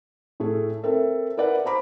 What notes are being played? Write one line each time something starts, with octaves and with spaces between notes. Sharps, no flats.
A2 A3 G#4
C4 A4 A#4 E5
A#4 B4 D5 E5 F#5
C5 A#5 B5 D6